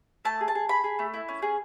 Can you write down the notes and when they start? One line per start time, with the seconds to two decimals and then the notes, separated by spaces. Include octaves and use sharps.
0.25 A3 A5
0.41 G#4
0.48 A5
0.55 G#4
0.69 G#4 B5
0.84 G#4
0.99 A3
1.14 E4
1.29 C#4
1.42 G#4